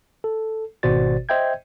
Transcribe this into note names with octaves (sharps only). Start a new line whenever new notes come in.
A4
G#1 B2 F#4 C5 D5 A6
C5 D#5 E5 G5 G6 G#6